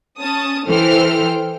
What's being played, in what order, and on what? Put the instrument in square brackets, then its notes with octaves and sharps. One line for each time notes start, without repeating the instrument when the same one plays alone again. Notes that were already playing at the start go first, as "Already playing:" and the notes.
[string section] C#4 A5 D#6
E3 A4 C5 G5 F6